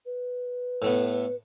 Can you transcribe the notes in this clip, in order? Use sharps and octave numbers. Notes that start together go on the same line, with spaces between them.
B4
A2 A3 B3
B4